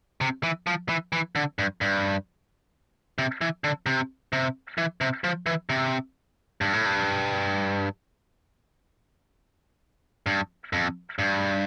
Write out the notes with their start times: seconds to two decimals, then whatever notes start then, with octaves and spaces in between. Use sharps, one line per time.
0.21 C3
0.43 E3
0.67 F3
0.89 E3
1.12 E3
1.35 D3
1.59 G2
1.81 G2
3.18 C3
3.41 E3
3.64 D3
3.86 C3
4.33 C3
4.78 E3
5.01 C3
5.24 F3
5.46 E3
5.69 C3
6.61 G2
6.73 A2
6.86 G2
10.26 G2
10.73 F2
11.19 G2